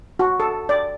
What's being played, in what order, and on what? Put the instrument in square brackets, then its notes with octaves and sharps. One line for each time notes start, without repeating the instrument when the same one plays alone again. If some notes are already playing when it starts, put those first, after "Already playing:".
[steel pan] F#4
A4
D5